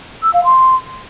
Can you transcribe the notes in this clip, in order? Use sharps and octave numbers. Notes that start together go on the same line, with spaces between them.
E6
F5
C6